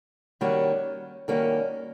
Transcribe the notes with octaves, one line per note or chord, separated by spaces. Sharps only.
D#3 G3 A#3 C#4 F#4
D#3 G3 A#3 C#4 F#4